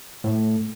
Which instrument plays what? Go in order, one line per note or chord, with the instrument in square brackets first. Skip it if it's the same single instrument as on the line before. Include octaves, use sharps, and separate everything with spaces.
[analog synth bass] A2